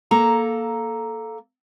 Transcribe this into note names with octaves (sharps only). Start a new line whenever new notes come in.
A#3 A4 A#5